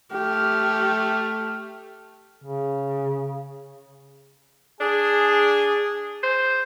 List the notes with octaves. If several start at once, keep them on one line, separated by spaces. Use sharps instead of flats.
A3 G4 F6
C#3
D4 G#4
C5